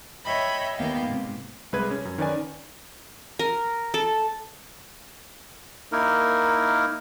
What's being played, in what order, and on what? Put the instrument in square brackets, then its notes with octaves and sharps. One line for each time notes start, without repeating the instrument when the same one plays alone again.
[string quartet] C#5 D#5 E5 G5 B5
D#2 A#3 B3 F5 G5
G#2 C3
[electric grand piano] C2 G#3 B4 G#6
C#4
F#2
D#3 C#4 B4 D5 G#5
[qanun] A#4
A4
[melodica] A#3 D#4 E4 A#4